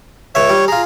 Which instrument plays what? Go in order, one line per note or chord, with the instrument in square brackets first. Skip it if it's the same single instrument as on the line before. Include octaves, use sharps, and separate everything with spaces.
[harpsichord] C#2 E5 [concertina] C#5
[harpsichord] G3
[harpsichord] F4 G#4 [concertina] A#5